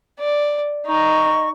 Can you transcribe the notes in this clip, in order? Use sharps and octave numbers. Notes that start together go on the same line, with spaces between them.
D5
D#4 D#5 C#6